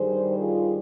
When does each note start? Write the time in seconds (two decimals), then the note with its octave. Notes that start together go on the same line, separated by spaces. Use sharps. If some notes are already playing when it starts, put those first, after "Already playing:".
Already playing: G2 D#3 G3 G#4 C5
0.37 F4 G#4